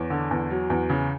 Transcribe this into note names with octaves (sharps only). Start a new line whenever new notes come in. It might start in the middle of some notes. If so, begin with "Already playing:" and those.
Already playing: E2 C#5
D3
E2
F#3
E2
C#3